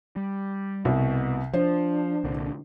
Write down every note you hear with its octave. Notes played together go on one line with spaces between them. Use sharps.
G3
C2 B2
F3 D4 C5
C2 A#2 D3